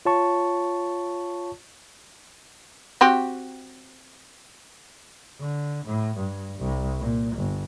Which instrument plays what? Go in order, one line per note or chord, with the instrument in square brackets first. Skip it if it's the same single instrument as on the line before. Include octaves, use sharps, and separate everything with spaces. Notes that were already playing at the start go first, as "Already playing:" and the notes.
[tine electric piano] F4 C#5 A5 C#6
[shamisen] C4 F#4 G4
[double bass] D3
A2
G2
C2
A#2
G1